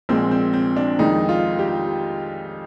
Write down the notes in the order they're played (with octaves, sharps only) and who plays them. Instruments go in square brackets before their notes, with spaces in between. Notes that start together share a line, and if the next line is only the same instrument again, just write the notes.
[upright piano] A#1 A#2 G#3 C4
C4
C4
D4
F2 D#3 G#3 D#4
F4
G4